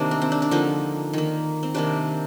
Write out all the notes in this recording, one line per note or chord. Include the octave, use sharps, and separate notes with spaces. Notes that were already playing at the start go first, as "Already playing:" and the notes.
Already playing: C3 D#3 A#3 D4
C4
C4
D4
D4
D3 F3 A#3 D#4
D#3 A#3
C4
C3 D#3 A#3 D4